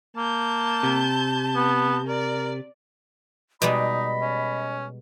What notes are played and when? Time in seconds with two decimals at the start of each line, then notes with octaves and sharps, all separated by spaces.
0.16 A#3 A5 G6
0.83 C3
1.55 B3
2.07 A#4 D5
3.62 B2 G3 G#3 D#4 D#5 B5
4.22 C#4